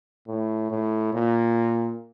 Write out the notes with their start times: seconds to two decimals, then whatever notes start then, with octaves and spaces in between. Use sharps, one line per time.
0.28 A2
0.71 A2
1.14 A#2